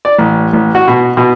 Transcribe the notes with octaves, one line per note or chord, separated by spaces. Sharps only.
D5
A1
A1
F#4
B2
B2